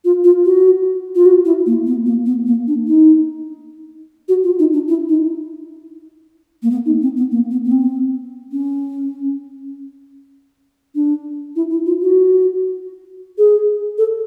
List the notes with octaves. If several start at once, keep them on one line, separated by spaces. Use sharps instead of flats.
F4
F4
F#4
F4
F#4
E4
A#3
B3
A#3
B3
A#3
D4
D#4
F#4
F4
D#4
D4
E4
D#4
A#3
B3
D#4
C4
B3
A#3
B3
B3
C4
C#4
D4
E4
E4
F4
F#4
G#4
A4